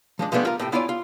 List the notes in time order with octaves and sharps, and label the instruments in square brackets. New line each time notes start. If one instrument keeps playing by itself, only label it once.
[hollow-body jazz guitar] F3 G#3 D4
F3 G#3 A3 B3 D4 G4
F4 A#4
A2 C3 G5
B3 E4 F4 C#5 D5 G#5
F4